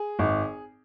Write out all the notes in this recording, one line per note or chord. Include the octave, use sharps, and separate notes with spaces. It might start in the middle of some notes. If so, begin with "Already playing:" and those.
Already playing: G#4
G#1